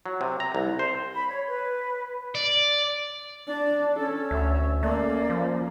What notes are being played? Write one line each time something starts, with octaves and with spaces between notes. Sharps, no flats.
F#3
C3
A#5
C2
C5
B5
C#5
B4
D5
D4 D5
C#4 A4
D2 E5
A3 A#3 C#4 D5
F3